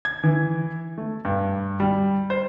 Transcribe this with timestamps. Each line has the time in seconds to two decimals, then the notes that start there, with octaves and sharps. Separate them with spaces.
0.05 G#6
0.24 E3
0.98 A3
1.25 G2
1.80 G3
2.30 C5